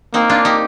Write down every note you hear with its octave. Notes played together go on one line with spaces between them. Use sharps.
A#3 C4 D#4
D4 F4
D#4 G4